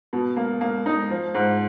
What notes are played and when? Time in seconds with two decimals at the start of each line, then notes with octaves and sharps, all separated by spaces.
0.13 B2
0.37 A#3
0.61 A#3
0.86 D#4
1.10 F3
1.34 G#2